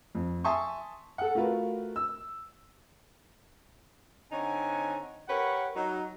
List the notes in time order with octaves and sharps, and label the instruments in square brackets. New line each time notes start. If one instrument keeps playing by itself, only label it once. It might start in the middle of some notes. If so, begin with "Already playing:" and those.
[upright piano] F2
E5 G#5 A5 C6 C#6 D#6
A4 F#5
A3 F4 F#4 A#4 B4
E6
[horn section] D3 C4 D#4 C#5 G#5
G4 A#4 B4 C#5 F#5
F#3 D#4